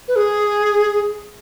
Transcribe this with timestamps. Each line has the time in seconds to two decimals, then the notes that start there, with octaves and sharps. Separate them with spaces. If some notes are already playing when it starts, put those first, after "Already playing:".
0.08 B4
0.17 G#4